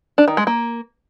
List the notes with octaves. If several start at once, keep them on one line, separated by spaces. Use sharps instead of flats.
D4
D#3
G#3
A#3